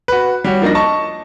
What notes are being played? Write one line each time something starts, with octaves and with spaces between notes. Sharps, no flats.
F#4 B4
G3 F#4 C#5
F3 A#3 D4 D#4 A#6
D#5 A5 C#6